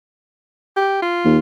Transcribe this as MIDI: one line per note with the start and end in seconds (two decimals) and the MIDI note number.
0.76 1.02 67
1.02 1.38 65
1.25 1.39 39